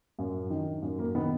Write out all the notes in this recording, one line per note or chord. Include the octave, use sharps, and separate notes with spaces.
F#2
D#3
F#2
A#3
D#3 B3